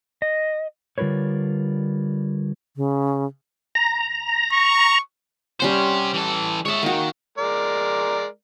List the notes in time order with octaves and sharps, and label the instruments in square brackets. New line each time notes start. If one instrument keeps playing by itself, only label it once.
[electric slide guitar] D#5
D3 G3 F4 A#4 B4 C#5
[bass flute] C#3
[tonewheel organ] A#5
[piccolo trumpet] C#6
[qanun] G3 C#4 F#5 [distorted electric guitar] G4 C5
[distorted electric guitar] E3 A4
[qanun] G#3 A5 [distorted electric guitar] C#5 E5
[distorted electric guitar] D#3 [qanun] A#3 F#4
[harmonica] G#3 A#4 D5